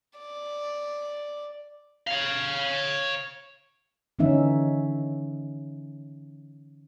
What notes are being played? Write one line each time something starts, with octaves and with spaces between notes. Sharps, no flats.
D5
C#5 F5
D3 E3 C#4 D#4 E5